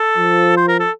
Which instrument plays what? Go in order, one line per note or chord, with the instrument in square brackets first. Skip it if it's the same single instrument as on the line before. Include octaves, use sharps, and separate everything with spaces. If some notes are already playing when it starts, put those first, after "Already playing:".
Already playing: [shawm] A4
[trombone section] F3
[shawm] C5
A#4
A4